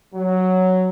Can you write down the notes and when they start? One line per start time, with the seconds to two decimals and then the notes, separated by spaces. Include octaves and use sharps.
0.14 F#3